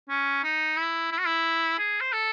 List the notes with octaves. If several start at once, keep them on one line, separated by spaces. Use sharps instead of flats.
C#4
D#4
E4
E4
F#4
E4
G#4
C5
A4